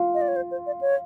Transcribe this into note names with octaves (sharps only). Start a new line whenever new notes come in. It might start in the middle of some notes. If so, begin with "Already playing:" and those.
Already playing: F4
D#5
D5
C#5
C5
C5
D5
C#5